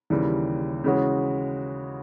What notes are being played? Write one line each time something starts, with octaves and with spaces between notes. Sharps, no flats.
D#2 C#3 E3 G3
C#3 E3 G#3 C#4 F#4